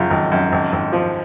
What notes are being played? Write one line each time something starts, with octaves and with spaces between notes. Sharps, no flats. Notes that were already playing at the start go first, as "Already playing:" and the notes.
Already playing: F#2 C#3 F4
G#1
F#2
G#1
G#1
F3